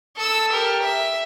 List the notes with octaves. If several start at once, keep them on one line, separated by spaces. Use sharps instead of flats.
A4 E6
G4 A#4
E5